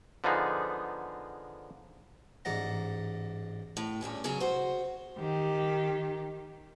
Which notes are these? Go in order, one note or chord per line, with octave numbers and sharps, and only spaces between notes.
D3 F3 B3 D#4 G#4
A1 G#2 D5 F#5 A#5
A2
G2 A#2 C#4 G#4
C#3 F#3 C#4 G#4
F#4 C5
D#3 G4